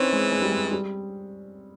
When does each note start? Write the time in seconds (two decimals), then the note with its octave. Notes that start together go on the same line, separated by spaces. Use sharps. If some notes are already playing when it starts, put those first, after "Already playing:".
Already playing: E3 C4 C#4 D#4
0.13 G#3
0.32 G#3
0.42 G3
0.52 G#3
0.72 G3